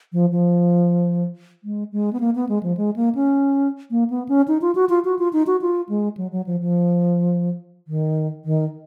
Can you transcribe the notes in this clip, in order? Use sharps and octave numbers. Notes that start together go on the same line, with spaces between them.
F3
F3
G#3
G#3
B3
A#3
B3
G#3
F3
G#3
A#3
C#4
A#3
B3
C#4
D#4
F4
F#4
F4
F#4
F4
D#4
F#4
F4
G#3
F#3
F#3
F3
F3
D#3
D#3